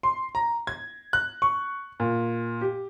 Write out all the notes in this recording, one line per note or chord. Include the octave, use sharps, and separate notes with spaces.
C6
A#5
G#6
F#6
C#6
A#2
G4